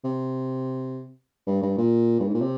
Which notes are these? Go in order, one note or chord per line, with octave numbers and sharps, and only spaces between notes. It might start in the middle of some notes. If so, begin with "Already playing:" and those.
C3
G2
G2
A#2
G2
G#2
A#2
C3